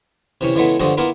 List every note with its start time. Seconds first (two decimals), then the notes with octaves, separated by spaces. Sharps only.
0.41 C3 E3 C#4
0.55 C#3 E3 G#3 A3 B3
0.80 G2 D3 F3 G#3 F#4 D#5
0.97 A#3 B3 E4 F4 A#4 B4